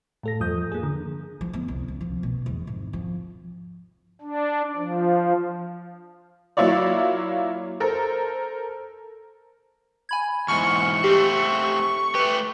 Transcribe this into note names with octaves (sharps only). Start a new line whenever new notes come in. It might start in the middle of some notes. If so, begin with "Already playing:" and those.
A2 A4 A#6
E2 G2 F3 D#6 G6
A#3 G#4
D3
F3
B3
C2
C#2
F3
B2
E2
G#1
F3
D4
F3
F#3 A#3 E4 F4 C#5 D5
A4 A#4 C5
G#5 B5 G#6
E2 G#2 G#5 C#6 F6
A3 C4 G4
A3 G4 B4